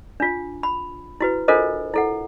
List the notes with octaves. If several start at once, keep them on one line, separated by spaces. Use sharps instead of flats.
D4 F4
B5
E4 F#4 B4
D4 F4 A4 A#4 C5 D#5
E4 A4 F#5